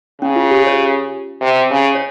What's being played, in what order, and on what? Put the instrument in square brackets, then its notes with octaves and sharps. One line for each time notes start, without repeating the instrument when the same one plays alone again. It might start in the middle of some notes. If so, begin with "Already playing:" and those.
[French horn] C#3 [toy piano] C#4
[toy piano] F4
G4
C#5
[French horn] C3
C#3
[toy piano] C#5